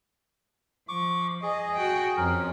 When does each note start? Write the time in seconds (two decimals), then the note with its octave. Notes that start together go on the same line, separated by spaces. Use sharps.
0.89 F3 C#6 D6
1.43 G#4 D#5
1.76 F#4 G5
2.17 F2 C#4 A#4